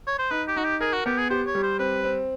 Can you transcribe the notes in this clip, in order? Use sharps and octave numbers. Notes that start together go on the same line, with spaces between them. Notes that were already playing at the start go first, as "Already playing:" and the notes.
C#5
C5
D#4 B4
G4
D#4 F#4
G4
G#4 A#4
F#4
B3 G4
G#4
G4 C5
C#5
G3
C5
C4 B4
C4